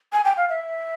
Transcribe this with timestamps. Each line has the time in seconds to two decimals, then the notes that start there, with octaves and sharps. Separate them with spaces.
0.13 G#5
0.25 G5
0.37 F5
0.49 E5